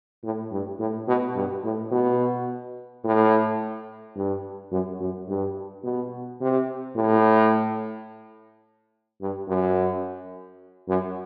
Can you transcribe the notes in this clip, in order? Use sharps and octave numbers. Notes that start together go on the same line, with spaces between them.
A2
G2
A2
B2
G2
A2
B2
A2
G2
F#2
F#2
G2
B2
C3
A2
G2
F#2
F#2